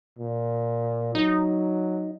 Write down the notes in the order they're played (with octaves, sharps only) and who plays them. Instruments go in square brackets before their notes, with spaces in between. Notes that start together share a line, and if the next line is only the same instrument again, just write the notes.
[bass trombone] A#2
[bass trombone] F#3 [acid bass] D#4